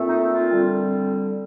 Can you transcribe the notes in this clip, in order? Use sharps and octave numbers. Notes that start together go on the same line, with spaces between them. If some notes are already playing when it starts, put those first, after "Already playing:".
Already playing: A#2 A3 C4
D#4
F4
D3 G3 C4